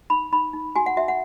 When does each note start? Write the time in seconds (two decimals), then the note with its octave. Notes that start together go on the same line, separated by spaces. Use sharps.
0.10 D#4 B5
0.32 D#4 B5
0.53 D#4
0.76 F#4 G#5
0.86 F#5
0.97 F#4 E5
1.08 F#5